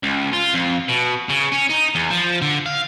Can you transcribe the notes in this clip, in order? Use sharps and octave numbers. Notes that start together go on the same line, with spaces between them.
C#2
F4
F2
B2
C#3
C#4
D#4
E2
F3
D3
F5